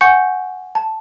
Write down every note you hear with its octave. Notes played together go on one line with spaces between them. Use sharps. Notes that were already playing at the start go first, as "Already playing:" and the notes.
F#5 G#5 C#6 G6 C#7
A5